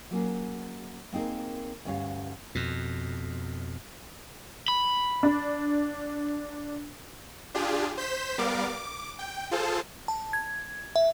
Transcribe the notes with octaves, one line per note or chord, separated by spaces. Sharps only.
F#3 A#3 C#4 G#4
A#3 C4 D#4 G#4 A#4
D2 G2 C#4 C#5 F5
F2 B2
B5
D4
D4 F4 G4 G#4
C5 G6 B6 E7
G3 B3 A#4 D5 F5 D6
D6
G5
F4 G#4 A4 C5 A5
A5
G#6
E5